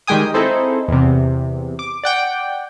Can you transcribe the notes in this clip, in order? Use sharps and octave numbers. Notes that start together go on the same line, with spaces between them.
D#3 G3 G#3 G5 G#5 D#6
C4 D#4 E4 G#4 A4 C5
E2 C3
D6
D5 F#5 G5